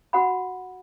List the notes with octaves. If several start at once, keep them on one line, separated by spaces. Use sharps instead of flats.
F#4 F#5 B5